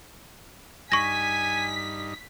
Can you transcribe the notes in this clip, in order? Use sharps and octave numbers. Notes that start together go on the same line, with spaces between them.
G2 D#4 G#5 C#6 A#6 B6